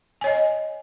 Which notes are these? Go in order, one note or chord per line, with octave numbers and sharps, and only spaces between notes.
C#5 D#5 G#5